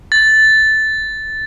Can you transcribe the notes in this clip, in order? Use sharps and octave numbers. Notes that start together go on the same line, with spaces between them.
A6